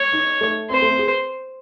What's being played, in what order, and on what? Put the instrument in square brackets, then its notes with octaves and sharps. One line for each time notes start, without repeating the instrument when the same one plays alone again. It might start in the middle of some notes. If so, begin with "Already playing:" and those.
Already playing: [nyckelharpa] C#5
[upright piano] D#4
A3
[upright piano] C4 [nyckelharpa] C5
[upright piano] A3
C4
G#4